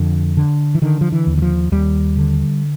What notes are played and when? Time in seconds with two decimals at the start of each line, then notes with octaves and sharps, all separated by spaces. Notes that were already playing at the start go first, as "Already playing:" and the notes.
Already playing: F2 D3
0.37 D3
0.75 E3
0.82 D3 D#3
1.01 F3
1.12 E3
1.27 D#2
1.38 E3
1.42 F3
1.72 D#2 G3
2.17 D3